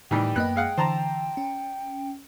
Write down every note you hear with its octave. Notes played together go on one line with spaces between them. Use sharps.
A2 D#3 E3 G3 G5
F#2 A#3 B3 D#5 F#6
G#3 F5 F#5
D3 E3 C5 A5 A#5
C#4